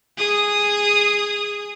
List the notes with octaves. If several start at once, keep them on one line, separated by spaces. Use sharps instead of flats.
G#4 D#6